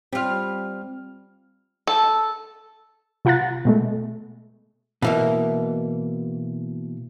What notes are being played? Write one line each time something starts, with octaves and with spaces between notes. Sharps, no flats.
G3 C4 F4 F6
A4
C3 F4 F#5 A#5 F#6 A6
B2 G#3 A3
B2 E3 A#3